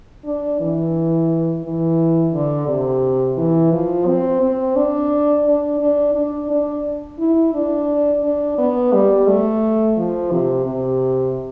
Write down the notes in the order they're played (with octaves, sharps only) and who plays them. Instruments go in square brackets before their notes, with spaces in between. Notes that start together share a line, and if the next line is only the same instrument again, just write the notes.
[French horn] D4
E3
E3
D3
C3
E3
F3
C4
C4
D4
D4
D4
D4
D4
E4
D4
D4
B3
G3
A3
F3
C3
C3